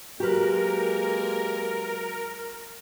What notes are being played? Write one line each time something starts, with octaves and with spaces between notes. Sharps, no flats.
F#3 G#3 A#3 F#4 G4 A#4 B4